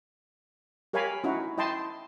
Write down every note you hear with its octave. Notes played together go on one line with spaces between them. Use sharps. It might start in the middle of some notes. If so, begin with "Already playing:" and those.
G4 A#4 C#5 F5 G#5 B5
C#4 D#4 E4 F#4
E4 D#5 G5 A5 C6